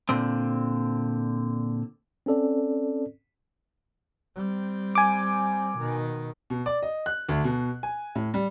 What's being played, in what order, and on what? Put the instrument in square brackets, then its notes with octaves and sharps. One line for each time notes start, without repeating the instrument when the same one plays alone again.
[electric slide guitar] A#2 D3 C4
[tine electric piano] C4 C#4 A4 D5
[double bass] G3 C4
[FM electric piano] G#5 D6
[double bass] B2 D#3
[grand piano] B2
D5
D#5
F#6
D2
B2
G#5
A2
G3